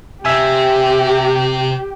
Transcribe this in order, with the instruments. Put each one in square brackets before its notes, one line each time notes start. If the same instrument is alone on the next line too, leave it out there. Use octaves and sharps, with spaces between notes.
[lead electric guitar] C3 C4 [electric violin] G4 [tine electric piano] E5 G#5